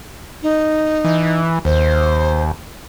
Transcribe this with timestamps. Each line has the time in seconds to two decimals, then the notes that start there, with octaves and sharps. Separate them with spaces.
0.43 D#4
1.05 E3
1.65 D#2 C5